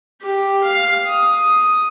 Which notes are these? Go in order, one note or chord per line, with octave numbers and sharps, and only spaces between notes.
G4
F5
D#6